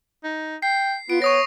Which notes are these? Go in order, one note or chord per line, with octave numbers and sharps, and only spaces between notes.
D#4
G5 C7
B3 F4 D7
C#5 C#6 D#6 A#6